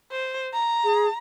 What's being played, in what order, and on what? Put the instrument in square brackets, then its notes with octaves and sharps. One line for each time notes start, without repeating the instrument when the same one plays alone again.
[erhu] C5
A#5
[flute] G#4